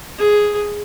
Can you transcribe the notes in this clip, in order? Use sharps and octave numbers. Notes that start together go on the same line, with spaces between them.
G#4